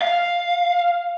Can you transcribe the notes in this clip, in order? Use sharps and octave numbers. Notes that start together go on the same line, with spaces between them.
F5